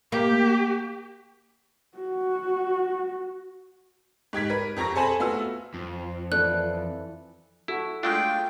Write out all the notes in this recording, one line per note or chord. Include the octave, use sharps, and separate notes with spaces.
A#3 G4
F#4
G#2 G4 G#6 B6
A#4 B4
F2 G4 A#5 C#6 A#6
G#4 A4 C5 G#5 A5 B5
A3 B3 F4 F#4 E6
F2 F3
E3 A4 D5 F#6
E4 F#4 A4
G#3 A3 D4 F4 G5